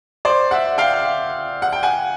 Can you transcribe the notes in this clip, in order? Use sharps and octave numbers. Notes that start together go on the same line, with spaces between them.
C5 D5
E5 F#5
F5 G5
F#5
G5
F#5 G#5